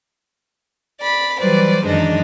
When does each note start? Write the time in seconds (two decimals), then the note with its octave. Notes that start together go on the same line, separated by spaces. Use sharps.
1.00 D5 B5
1.40 E3 F#3 G3 B4 C5 D5
1.86 F#2 D#3 E3 G#3 D4 D#4